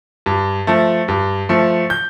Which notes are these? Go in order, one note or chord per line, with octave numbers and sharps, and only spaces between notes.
G2
F3 A3
G2
F3 A3
G6